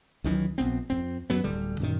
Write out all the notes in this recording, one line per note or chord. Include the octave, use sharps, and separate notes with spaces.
C#2 D#3 E3 F#3
A#1 F2 B3 C4
F2 C4
F#2 F#3 B3
D1 D3 G3
F#2 A#2 D#3